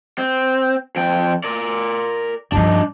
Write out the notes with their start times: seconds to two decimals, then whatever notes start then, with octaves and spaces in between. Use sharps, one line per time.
0.18 C4
0.96 F2 G5
1.44 A#4 D5
2.52 G2 F3 D4 D#4